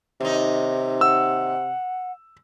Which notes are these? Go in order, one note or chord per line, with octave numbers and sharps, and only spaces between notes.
D#2 C3 D#4
F#5 E6